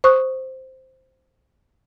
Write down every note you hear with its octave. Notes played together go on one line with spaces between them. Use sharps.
C5 C#6 D#6 F#6